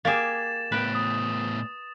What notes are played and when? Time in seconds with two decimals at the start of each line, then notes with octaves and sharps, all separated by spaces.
0.05 A#3 G4 G#4 A6 E7
0.72 A2 B3 B4 G5
0.95 D#6